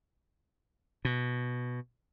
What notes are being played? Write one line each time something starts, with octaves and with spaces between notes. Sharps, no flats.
B2